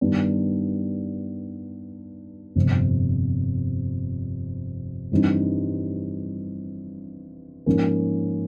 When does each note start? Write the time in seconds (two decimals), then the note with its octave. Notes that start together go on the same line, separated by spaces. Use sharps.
0.01 G2 D#3 G3 B3 D4
2.55 G1 F2 C3
5.12 G2 E3 G3 C4 D#4
7.66 G#2 F3 A#3 C#4